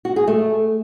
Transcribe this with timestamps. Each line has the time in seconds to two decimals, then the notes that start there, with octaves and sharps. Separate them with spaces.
0.05 F#4
0.16 G#4
0.28 A3